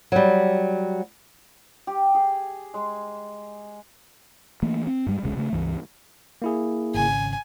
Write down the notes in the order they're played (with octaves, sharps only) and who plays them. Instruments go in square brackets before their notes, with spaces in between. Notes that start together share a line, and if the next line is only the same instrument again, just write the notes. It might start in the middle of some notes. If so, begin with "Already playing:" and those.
[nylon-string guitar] F#3 G3
[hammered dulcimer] G4
G#4
G#3
[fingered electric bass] E3 A3 A#3
C4
G2 G3 G#3
E1 C2 C#3 G#3
C#3 A3
C#2 G2 E3
[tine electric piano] A#3 E4 G#4
[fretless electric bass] G#1 C#3 [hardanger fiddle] G#5